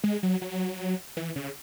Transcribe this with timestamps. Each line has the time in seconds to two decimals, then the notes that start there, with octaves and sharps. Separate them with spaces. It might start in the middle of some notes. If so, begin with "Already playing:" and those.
0.04 G#3
0.23 F#3
0.42 F#3
1.17 E3
1.36 C#3